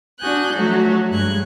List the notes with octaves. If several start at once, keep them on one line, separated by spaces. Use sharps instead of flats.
D4 F#4 G#5 D#6 F#6 G6
F3 F#3 A3 F#4
G2 G#3 F#6 G#6